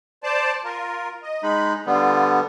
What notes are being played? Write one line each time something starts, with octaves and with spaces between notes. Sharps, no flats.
C5 D5 A5
F4 A#4
D#5
G#3 D#4 B5
D3 G3 B3 F4